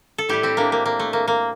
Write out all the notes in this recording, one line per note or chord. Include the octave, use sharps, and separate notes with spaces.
A4
A2 G3 E4 G4
C4 E4
A#3 D4
A#3
A#3
A3
A#3
A#3